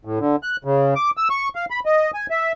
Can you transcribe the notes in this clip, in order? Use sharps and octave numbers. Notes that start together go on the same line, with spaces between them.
A2
D3
F#6
C#3
D6
E6
C#6
F5
B5
D#5
G#5
E5